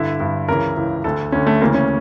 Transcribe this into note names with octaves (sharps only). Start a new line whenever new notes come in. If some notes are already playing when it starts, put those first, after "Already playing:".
Already playing: G2 D3 E4
G2 D3
C#2 C#3 E3 A#4
C#2 C#3 E3
D2 D3 A4
D2 D3 C#4
A3
D2 C#3 E3 A#3
C#4